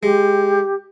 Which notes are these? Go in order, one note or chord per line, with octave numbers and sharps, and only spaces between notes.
G#3 G4